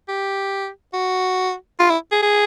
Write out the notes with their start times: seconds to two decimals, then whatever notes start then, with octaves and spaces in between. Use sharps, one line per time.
0.08 G4
0.93 F#4
1.79 F4
1.90 E4
2.12 G#4
2.22 G#4